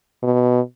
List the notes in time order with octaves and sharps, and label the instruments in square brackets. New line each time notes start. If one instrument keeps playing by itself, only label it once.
[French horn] B2